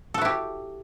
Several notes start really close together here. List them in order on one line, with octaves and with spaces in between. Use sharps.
A4 F#4 E4 G4